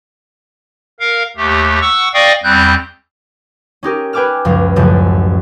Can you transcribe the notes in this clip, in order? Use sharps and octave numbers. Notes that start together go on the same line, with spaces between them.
A#4 F5
D#2 A3 G4
F#5 C#6 E6
D5 D#5 F5 G5 C#6 D#6
E2 G3 C4 F#6 G6
C#4 D#4 G4 A#4
B4 G5 G#5 D6 E6 F6
C#2 F#2 F3 F5
A1 F#2 C#3 F3 A3